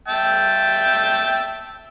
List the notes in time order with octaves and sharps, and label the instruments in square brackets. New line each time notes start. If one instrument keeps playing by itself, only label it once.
[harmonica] E5 G5 A5